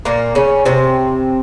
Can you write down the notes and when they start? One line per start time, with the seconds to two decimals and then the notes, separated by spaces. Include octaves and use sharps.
0.05 A#2 A#3
0.35 C#3 C#4
0.65 C3 C4